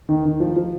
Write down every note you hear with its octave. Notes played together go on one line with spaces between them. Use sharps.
D#3
D#3
F3
F3